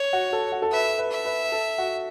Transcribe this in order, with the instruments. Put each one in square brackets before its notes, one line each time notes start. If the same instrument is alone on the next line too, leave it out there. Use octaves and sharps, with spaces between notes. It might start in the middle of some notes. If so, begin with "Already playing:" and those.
Already playing: [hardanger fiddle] C#5
[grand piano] F#4
A4
F#4
A4
[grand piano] B4 [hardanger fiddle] E5
[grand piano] B4
[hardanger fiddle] E5
[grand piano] B4
A4
F#4